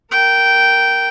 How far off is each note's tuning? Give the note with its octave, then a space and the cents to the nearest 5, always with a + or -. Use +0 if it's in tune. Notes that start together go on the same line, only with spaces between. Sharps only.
A#4 +0 G5 -15